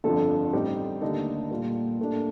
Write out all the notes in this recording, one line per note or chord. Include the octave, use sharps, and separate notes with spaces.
G1 F2 D3 F3 A4
A1 A2 G3 C4 D#4 G4
D#2 D3 A3 D#4 A4
A#2 G3 A#3 F4
A#2 A3 D4